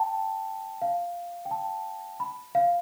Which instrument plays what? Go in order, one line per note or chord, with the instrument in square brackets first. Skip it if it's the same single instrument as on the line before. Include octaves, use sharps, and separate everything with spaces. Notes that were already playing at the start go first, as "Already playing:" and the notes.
Already playing: [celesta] G5 A5
F5
G5
A5
B5
F5